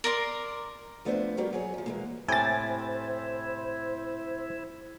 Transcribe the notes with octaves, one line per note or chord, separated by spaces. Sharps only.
A#4 D5 C6
F3 A3 B3 D4 E4 C5
G3 A#3 F#4 G4 A#4 G5
F#3 G#4 C#5
C3 F3
E3 G#3 A#3
A2 C3 E4 C5 G5 G#5 A6